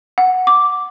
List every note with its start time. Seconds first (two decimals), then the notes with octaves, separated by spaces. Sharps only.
0.18 F#5
0.47 D6